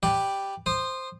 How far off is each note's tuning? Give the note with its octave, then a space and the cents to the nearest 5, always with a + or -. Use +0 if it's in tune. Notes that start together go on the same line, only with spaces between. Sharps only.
G4 +0 B4 +0 D5 +0
C5 +0 D#6 -25